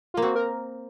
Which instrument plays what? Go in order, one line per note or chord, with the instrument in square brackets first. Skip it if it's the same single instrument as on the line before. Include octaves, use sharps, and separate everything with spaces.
[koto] A#3 [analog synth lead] F4
[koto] C4 [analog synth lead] F#4
[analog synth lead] A#4